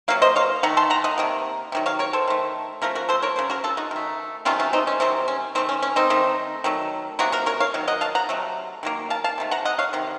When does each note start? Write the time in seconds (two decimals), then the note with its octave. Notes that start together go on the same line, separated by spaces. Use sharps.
0.08 C3 F#3 A#3 F5
0.22 C5 D#5
0.36 C#5 F5
0.63 D#3 A3 F#5 A#5
0.77 A5 C6
0.90 F#5 A#5
1.04 D#5 F#5
1.18 C3 D#3 A#3
1.72 C3 D#3 F#3
1.86 C#5 F5
1.99 A#4 C#5
2.13 A4 C5
2.27 D#3 A3
2.82 C#3 F3 A3 A#4
2.95 F#4 A#4
3.09 A4 C5
3.22 A#4 C#5
3.36 C#3 F#3 C5
3.50 F#4 A#4
3.64 F4 A4
3.77 D#4 F#4
3.91 D#3 A3
4.45 C3 D#3 F#3 A3 C#4 F4
4.59 C#4 F4
4.73 C4 D#4
4.87 C#4
5.00 C3 D#3 F#3 C4
5.28 C#4
5.55 D#3 A3 C4
5.69 C#4
5.82 C#4
5.96 C4 D#4
6.10 D#3 A3
6.64 D#3 F#3 A3
7.19 C3 F#3 A#3 D#4 F#4
7.32 F#4 A#4
7.46 A#4 C#5
7.60 C#5 F5
7.74 D#3 F#3
7.88 D#5 F#5
8.01 F5 A5
8.15 F#5 A#5
8.29 C3 F#3 A3
8.83 D#3 F#3 A#3
9.10 F5 A5
9.24 F5 A5
9.38 C3 D#3 A3
9.51 F#5 A#5
9.65 D#5 F#5
9.79 C#5 F5
9.93 C3 D#3